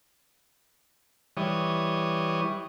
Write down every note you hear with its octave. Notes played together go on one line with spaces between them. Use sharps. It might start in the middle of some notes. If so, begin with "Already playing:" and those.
E3 G3 C#5 D#6